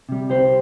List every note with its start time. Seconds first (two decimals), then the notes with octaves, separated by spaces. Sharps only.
0.09 C3 G3
0.29 C2 G4 C5